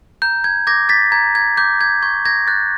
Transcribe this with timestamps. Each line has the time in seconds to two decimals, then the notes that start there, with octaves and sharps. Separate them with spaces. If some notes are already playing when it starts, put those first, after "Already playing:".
0.22 A#5 G6
0.44 G#6
0.67 D6 G6 G#6 A#6
0.89 A6 B6
1.12 A#5 G#6
1.35 G#6
1.57 D6 G6
1.81 G#6
2.02 C#6 G#6
2.26 G#6 A#6
2.47 F#6 G6 A6